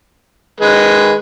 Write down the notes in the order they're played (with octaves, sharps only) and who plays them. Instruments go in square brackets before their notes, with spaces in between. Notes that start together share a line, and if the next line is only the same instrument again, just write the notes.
[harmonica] D#3 G#3 B4